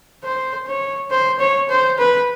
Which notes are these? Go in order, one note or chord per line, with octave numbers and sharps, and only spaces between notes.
C5
C#5
C5
C#5
C5
B4